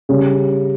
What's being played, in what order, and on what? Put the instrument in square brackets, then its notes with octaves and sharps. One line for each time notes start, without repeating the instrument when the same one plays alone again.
[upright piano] C#3 G3 C#4